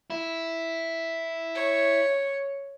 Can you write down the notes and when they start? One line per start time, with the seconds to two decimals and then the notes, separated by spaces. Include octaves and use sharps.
0.10 E4
1.56 C#5